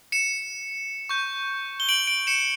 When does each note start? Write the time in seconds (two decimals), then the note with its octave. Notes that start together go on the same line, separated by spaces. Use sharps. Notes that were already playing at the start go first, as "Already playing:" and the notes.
0.12 C#7 E7
1.09 C#6 G6
1.80 G7
1.89 D7 F#7
2.07 D7 F#7
2.27 C#7 E7